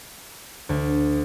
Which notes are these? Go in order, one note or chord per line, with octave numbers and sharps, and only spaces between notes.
D2